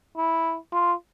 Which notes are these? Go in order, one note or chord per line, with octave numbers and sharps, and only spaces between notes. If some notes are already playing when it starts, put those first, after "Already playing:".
E4
F4